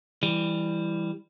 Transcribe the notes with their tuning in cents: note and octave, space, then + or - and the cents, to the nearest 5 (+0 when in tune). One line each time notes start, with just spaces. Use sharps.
E3 +0 G3 +10